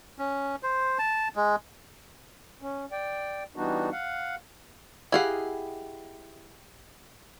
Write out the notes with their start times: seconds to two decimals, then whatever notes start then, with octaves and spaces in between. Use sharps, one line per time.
0.18 C#4
0.63 C5
0.99 A5
1.36 G#3
2.62 C#4
2.92 D5 G5
3.56 E3 G3 B3 D4 D#4 F#4
3.92 F5 F#5
5.12 E4 G4 G#4 D#5 F5 F#5